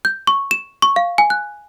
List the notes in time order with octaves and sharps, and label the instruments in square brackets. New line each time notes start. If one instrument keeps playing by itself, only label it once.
[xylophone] G6
C#6
E7
C#6
F5
G#5
F#6